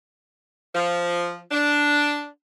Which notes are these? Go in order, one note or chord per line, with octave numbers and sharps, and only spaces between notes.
F3
D4